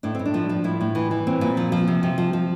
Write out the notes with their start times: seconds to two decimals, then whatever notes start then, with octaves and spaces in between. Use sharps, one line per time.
0.03 A2 D4
0.15 A2 C4
0.25 D4
0.34 F3
0.49 F3
0.64 A2 E4
0.81 A2
0.95 E3
1.11 E3
1.27 A#2 C4
1.41 A#2
1.57 F3
1.72 F3
1.88 C3
2.03 C3
2.18 F3
2.33 F3